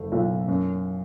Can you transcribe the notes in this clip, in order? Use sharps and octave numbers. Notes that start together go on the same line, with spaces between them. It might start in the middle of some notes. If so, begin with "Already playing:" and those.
Already playing: F#1 A3
B1
F#2